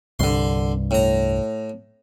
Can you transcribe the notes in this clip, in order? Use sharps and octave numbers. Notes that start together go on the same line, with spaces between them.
C2 G2 D3 C6
A2 A#5